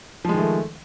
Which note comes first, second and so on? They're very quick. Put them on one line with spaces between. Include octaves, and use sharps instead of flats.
F3 G#3 D#3 A3